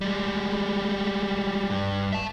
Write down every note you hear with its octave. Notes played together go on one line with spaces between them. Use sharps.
G3 G#3
G2
E5 A5